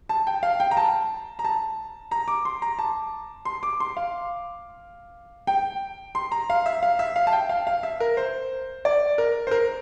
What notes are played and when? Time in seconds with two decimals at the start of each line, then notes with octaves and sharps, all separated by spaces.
0.09 A5
0.27 G5
0.43 F5
0.60 G5
0.71 A#5
0.77 A5
1.39 A#5
1.44 A5
2.11 A#5
2.28 D6
2.45 C6
2.62 A#5
2.79 A5
3.45 C6
3.63 D6
3.80 C6
3.97 F5
5.47 G5
6.15 C6
6.32 A#5
6.50 F5
6.66 E5
6.83 F5
6.99 E5
7.16 F5
7.27 A5
7.33 G5
7.49 F5
7.67 F5
7.83 E5
8.00 A#4
8.17 C5
8.85 D5
9.18 A#4
9.47 C5
9.51 A#4